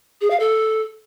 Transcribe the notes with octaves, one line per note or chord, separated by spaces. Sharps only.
G#4
F5
A4